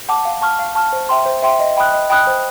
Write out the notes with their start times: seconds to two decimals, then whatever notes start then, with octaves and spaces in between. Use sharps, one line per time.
0.09 F#5 A5 D6
0.25 F5
0.41 A5 C#6 F6
0.59 F5
0.75 A5 C#6 F6
0.93 C5
1.09 E5 G5 C6
1.26 C5
1.43 E5 G5 C6
1.60 D#5
1.77 G5 B5 D#6 F#6
1.93 D#5
2.10 G5 B5 D#6 F#6
2.27 C5